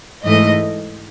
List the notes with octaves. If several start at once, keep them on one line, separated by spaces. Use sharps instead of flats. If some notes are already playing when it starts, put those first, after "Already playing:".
G#2 E3 A3 D#5